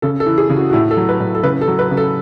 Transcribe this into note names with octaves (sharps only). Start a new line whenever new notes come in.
C#3 A4
A4
E3
G#4
C#3
F#4
F#4
A2 E4
A4
F#3
B4
A2
A4
C#3 B4
A4
F#3
B4
C#3
A4